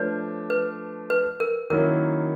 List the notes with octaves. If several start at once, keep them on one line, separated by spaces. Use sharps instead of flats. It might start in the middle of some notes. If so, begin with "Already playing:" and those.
Already playing: F3 A3 D4 B4 C#5
B4
B4
A#4
D#3 F#3 A#3 C#4 E4 A#4